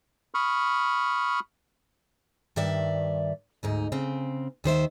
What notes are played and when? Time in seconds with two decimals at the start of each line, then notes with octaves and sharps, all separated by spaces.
0.34 B5 C#6 D#6 F6
2.56 G2 D#3 D5 E5
3.63 D2 G#2 D#4
3.92 C#3 C4
4.64 D#2 D#3 C5 E5